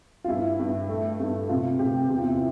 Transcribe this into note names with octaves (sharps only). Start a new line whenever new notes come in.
F4
G2 E4
G2
A3
G2
C3 F4
C3 G4
E2 G4
F4
E4
F4